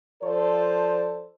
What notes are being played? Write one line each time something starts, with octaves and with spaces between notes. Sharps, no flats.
F3 A4 C5 D5